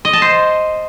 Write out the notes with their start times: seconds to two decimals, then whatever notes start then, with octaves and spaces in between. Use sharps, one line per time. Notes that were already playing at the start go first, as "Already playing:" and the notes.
0.05 D#5
0.13 A5
0.22 C5